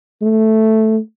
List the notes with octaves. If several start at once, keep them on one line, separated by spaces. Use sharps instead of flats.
A3